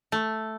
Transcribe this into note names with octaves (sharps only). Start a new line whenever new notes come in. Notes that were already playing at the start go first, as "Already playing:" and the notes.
A3